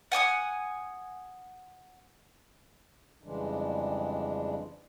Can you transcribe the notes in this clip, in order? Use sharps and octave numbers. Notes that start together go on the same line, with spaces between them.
F#5 G#5 D6 D#6
F2 C#3 E3 G3 G#3 D4